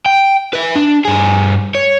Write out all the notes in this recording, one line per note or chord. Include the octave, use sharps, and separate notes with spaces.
G5
B4 E5
D4
G2 G#4
C#5